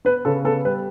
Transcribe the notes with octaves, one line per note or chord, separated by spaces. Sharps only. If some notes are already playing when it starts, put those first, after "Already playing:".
B3 B4
C#3 A4
B3 A4
G3 B4